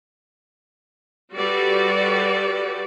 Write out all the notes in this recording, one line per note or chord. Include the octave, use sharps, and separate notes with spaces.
G3 F#4 G4 A4 B4 D5